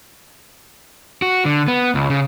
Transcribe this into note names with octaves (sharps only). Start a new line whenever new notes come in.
F#4
D3
B3
C#2
C#3